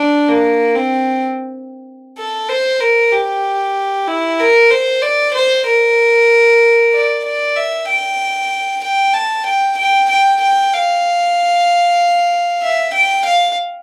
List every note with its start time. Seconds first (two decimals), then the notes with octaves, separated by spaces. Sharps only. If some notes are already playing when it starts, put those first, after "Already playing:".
Already playing: D4
0.28 A#3
0.75 C4
2.18 A4
2.49 C5
2.80 A#4
3.12 G4
4.07 E4
4.40 A#4
4.71 C5
5.02 D5
5.34 C5
5.67 A#4
6.93 D5
7.25 D5
7.56 E5
7.87 G5
8.83 G5
9.14 A5
9.45 G5
9.77 G5
10.10 G5
10.41 G5
10.73 F5
12.62 E5
12.93 G5
13.25 F5